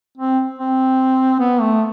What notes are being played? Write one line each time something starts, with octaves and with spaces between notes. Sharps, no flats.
C4
C4
B3
A3